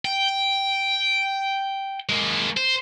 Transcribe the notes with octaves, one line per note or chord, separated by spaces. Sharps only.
G5
G#3 A#3
C5